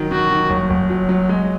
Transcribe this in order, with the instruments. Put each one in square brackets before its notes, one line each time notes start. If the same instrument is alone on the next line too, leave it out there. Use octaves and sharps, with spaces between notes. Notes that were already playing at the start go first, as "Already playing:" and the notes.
Already playing: [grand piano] D#3 F#3
[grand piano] D#3 [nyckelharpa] F#4
[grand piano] D#3
F#1
F#1
F#3
F#3
G#3